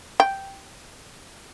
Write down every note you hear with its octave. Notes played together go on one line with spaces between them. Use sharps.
G5